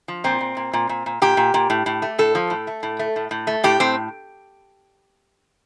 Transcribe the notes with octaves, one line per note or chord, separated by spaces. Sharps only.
F3
A#2 C4
A#2
A#2
A#2
A#2
A#2
A#2 G4
A#2
A#2
A2
A2
A3
A2 A4
F3
A2
A3
A2
A3
A2
A2
A3
A2 G4
A2 C4